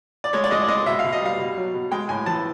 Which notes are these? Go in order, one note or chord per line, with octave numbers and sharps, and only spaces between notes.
D5
G#3 C#5
D5
G#3 D#5
D5
G#3 D#5
B2 E5
F5
B2
D#5
G3 F5
B2
F#3
B2
G#3 G5
A2 G#5
E3 A5